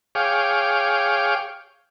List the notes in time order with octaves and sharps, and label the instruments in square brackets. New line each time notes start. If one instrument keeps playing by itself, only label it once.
[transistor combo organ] G#4 C#5 F5 G5 D6